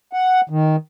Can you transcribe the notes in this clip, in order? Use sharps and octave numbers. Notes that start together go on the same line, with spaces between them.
F#5
D#3